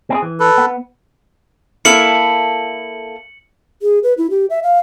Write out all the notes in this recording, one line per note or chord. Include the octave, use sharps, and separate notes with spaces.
C4 E4 G#4
E3
A4 B4
B3
A#3 E4 A4 C#7 F#7
G#4
B4
E4
G4
E5
F5